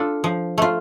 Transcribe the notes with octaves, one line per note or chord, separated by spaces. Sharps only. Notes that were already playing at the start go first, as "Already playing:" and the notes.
Already playing: D4 F4 A4
F3
A3 F4